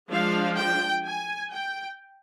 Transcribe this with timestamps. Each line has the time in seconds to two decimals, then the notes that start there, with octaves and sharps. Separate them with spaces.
0.11 F3 G#3 D4 F5
0.58 G5
1.06 G#5
1.52 G5